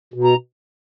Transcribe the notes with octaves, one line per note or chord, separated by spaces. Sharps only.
B2
A#5